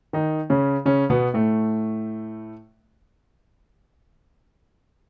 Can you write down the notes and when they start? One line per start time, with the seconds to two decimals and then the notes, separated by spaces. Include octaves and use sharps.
0.13 D#3 D#4
0.50 C#3 C#4
0.86 C#3 C#4
1.10 B2 B3
1.34 A2 A3